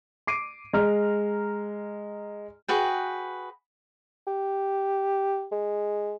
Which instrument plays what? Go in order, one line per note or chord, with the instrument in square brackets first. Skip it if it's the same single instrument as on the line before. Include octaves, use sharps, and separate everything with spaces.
[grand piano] D6 C7 D7 D#7
G#3 A#5 F6
[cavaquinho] F#4 G#4 B4 G5
[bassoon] G4
G#3